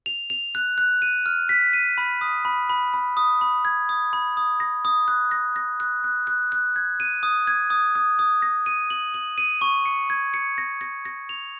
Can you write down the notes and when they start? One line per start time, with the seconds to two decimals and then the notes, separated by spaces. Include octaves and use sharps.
0.06 F7
0.30 F7
0.55 F#6
0.78 F#6
1.02 D#7
1.26 F6
1.49 B6
1.73 D#7
1.98 B5
2.21 D#6
2.45 B5
2.69 B5
2.94 B5
3.17 D#6
3.41 B5
3.65 G#6
3.89 D#6
4.13 B5
4.37 D#6
4.60 A#6
4.85 D#6
5.08 F#6
5.31 A#6
5.56 A#6
5.80 F#6
6.04 F#6
6.27 F#6
6.52 F#6
6.76 G#6
7.00 D#7
7.23 D#6
7.47 G#6
7.70 D#6
7.95 D#6
8.19 D#6
8.42 A#6
8.66 D#7
8.90 F#7
9.14 F#7
9.38 D#7
9.61 C#6
9.86 C#7
10.10 G#6
10.34 C#7
10.58 A#6
10.81 A#6
11.05 A#6
11.29 F7